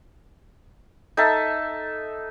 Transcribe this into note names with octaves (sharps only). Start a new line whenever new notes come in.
D#4 A4 E5 A5